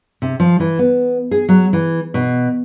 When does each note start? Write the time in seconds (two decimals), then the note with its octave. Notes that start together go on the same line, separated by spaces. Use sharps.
0.22 C3
0.40 F3
0.60 E3
0.79 B3
1.31 G#4
1.49 F#3
1.73 E3
2.14 B2